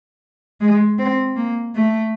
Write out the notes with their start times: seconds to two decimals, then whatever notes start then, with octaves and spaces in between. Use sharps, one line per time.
0.61 G#3
0.99 C4
1.36 A#3
1.75 A3